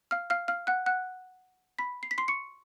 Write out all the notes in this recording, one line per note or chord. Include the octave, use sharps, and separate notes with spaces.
F5 F6
F5 F6
F5 F6
F#5 F#6
F#5 F#6
B5 B6
C7
B6
C6 C7
C#6 C#7